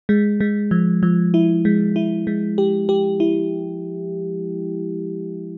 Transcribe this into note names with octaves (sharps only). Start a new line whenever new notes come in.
G#3
G#3
F3
F3
E4
G#3
E4
G#3
G4
G4
E4